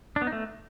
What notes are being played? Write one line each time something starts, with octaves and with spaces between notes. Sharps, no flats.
D4
B3
D#4
A3